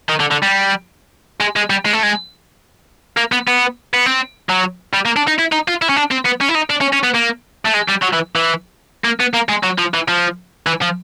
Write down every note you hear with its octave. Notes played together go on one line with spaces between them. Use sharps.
D#3
D3
D3
G3
G#3
G#3
G3
G#3
A3
G#3
A#3
B3
B3
B3
C4
F#3
G3
A#3
D4
D#4
E4
D#4
F4
E4
C#4
D4
C4
B3
C#4
E4
D#4
D4
C#4
C#4
B3
A#3
A3
G#3
G3
F#3
E3
E3
A#3
B3
A#3
G#3
F#3
F3
E3
F3
E3
F3